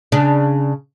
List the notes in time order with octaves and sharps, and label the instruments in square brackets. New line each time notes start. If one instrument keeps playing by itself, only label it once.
[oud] C#3 D4